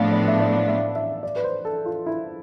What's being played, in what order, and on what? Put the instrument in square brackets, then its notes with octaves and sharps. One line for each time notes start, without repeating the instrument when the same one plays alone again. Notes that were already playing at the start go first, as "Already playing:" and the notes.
Already playing: [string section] A2 F3 B3 D4 [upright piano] F5
[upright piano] D5
E5
D5
E5
E5
D5
B4
C5
A4
F4
E4